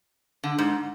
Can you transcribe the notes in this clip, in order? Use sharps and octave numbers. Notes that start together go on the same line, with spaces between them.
D3
G#2